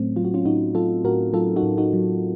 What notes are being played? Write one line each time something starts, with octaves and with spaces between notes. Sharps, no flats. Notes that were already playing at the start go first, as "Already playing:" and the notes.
Already playing: A2 F#3 A3 C4 C#4
F#3 F4
F#4
C#4 F4
A2 D#4 F#4
F#3 F4 A4
A2 F#4 A#4
F#3 F4 A4
D#4 F#4
A2
D#4 F#4
F#3